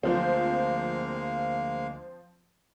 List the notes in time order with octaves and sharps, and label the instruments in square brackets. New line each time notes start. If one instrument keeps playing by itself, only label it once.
[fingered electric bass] D2 [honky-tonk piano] F3 C4 [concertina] G#3 A#3 F5